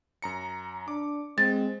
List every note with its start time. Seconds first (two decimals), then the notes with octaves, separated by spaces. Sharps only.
0.22 F#2 A#5 C#7
0.88 D4 D6
1.38 G#3 C4 A6